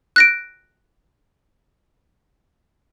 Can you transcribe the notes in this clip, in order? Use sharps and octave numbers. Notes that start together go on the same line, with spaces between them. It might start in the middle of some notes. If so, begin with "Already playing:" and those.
F#6 A#6 D7